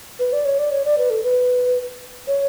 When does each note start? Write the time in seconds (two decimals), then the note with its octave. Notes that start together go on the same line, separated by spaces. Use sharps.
0.19 B4
0.33 D5
0.45 C#5
0.59 D5
0.71 C#5
0.85 D5
0.98 B4
1.10 A4
1.23 B4
2.27 C#5